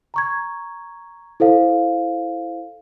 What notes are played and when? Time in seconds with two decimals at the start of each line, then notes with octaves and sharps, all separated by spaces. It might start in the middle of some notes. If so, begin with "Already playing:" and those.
0.14 A#5 C#6 G#6
1.40 E4 A4 C5 F5